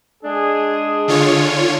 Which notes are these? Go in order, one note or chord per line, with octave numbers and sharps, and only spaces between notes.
G#3 D4 G#4
D3 F4 C#5